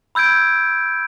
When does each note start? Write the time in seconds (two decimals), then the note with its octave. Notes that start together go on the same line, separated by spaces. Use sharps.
0.15 B5 E6 G6 G#6 D7